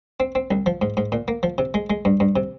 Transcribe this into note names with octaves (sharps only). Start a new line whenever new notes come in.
C4
C4
C2
F3
G#2
G#2
A#2
A#3
F3
C3
G#3
G#3
G2
G2
C3